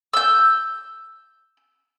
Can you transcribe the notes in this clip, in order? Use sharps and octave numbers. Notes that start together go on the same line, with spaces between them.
E6 G6